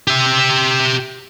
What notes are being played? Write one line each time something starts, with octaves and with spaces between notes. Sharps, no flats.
G4 E5